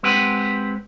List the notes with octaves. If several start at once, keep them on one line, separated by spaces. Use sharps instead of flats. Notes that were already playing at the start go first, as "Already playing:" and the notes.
G#3 C4 G4 B4 F#5